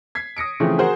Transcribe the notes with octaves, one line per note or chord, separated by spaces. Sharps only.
G#6 B6 C7
D#6 A#6 C#7 D7
C#3 E3 F3 A3 C4
F#4 G#4 A#4 C5 F#5